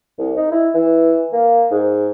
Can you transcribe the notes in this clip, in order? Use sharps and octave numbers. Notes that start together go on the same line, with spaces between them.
C2
D#4
E4
E3
A#3
G#2